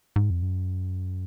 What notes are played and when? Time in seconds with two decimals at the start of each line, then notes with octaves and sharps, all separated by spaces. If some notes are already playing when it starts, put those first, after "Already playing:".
0.16 G#2
0.30 F2
0.43 F#2